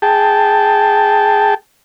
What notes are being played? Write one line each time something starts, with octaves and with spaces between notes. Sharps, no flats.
G#4 G5 A5